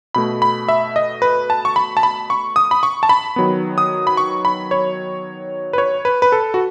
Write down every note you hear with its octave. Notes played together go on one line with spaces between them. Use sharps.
B2 A3 B5
B5
E5
D#5
B4
A5
C#6
B5
A5
B5
C#6
D#6
B5
C#6
A5
B5
D#3 F#3 B3
D#6
B5
C#6
B5
C#5
B4
C#5
B4
B4
A4
F#4